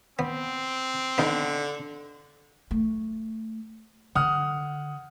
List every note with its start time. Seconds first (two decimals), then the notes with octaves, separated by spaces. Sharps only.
0.19 B3 C4
1.18 D3 B3 D#4
2.71 A3
4.15 D3 F#5 D#6 F6